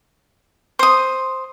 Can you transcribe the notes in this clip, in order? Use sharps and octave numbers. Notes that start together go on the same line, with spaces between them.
C5 D#6